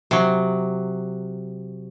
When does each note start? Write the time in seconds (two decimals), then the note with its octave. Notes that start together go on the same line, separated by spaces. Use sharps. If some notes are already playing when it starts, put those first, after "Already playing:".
0.11 C3 F#3